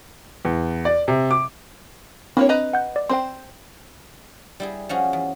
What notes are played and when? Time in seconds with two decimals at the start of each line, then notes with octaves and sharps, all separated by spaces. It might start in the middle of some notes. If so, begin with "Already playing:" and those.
0.45 E2
0.85 D5
1.08 C3
1.31 D6
2.37 A#3 C4 D4 E4 C#5 B5
2.49 B4 D#5 A#5
2.73 F#5 G6
2.96 D5
3.09 C4 C5 G5 C6
4.60 G3 E4 G#4
4.89 F3 C#4 F#4 G#4
5.13 E2